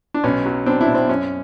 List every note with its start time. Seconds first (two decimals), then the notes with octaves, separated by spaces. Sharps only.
0.14 D4
0.24 B1 C#4
0.46 F#3
0.66 B2 C4 D4
0.81 D4 E4
0.88 B1
0.95 C4
1.09 F#2 C#4